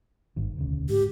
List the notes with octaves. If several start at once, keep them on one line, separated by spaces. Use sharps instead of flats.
G#1 G2 D#3
E1 D2 C#3
G#2 G4